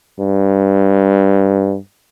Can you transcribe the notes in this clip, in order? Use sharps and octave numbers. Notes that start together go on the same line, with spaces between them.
G2